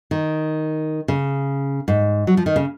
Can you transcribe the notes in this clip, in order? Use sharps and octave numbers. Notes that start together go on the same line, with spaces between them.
D#3
C#3
G#2
F#3
F3
D#3
C#3